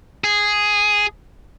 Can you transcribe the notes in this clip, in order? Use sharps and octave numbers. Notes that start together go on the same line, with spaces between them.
G#4